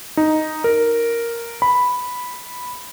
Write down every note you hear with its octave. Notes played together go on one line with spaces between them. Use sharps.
D#4
A#4
B5